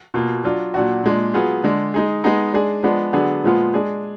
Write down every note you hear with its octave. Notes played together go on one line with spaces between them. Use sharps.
B2 A#3 F4
F#3 D4 F4
A#2 F#3 D4 F#4
A#2 G#3 D4
F#3 B3 F4 G#4
D3 G#3 D4
G#3 D#4 G#4
G#3 B3 D#4 G#4
G#3 D4 G#4
F3 G#3 B3 D4
D3 F#3 B3 D4 G#4
A#2 F3 G#3 B3 F4
G#3 D4 G#4